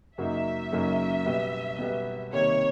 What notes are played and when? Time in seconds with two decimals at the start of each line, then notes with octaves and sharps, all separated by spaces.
0.18 F#2 C#3 F#3 A#3 D#4 E5
0.71 F#2 C#3 F#3 A#3 D#4
1.26 B2 G3 B3
1.79 B2 G3 B3
2.33 C3 D#3 G3 A#3 C#5